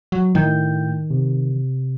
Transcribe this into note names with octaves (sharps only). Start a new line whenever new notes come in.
F#3
A2 D#3 G5 G6
C3